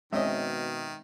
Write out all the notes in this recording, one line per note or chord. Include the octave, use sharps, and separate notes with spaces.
B2 D#3 G#3 C4 C#4 D#5 E5